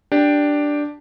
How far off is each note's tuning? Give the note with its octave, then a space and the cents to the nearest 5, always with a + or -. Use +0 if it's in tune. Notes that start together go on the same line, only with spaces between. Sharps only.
D4 +0 G4 +0